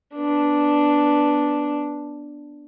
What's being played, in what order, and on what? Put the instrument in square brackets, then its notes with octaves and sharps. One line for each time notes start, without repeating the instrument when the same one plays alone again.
[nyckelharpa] B3 D4